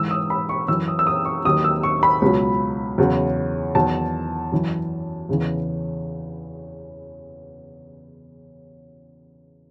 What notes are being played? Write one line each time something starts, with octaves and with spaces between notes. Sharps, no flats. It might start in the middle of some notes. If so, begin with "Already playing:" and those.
Already playing: G#2 E3 E6
D#6
B5
C#6
F#2 E3 E6
D#6
E6
D#6
C#6
D#2 D#3 F#3 D#6
E6
C#6
B5
C#2 B2 F#3
E2 C#3 F#3
E2 D#3 F#3 A5
F#2 E3
E2 C#3 E3